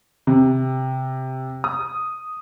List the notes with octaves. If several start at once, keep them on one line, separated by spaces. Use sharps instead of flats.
C3
D#6